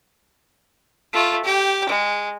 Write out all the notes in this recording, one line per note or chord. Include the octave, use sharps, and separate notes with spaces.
A3 F4
G4 G5
G#3